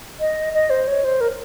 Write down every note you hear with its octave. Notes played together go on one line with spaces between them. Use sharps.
D#5
D#5
C5
C#5
C5
A#4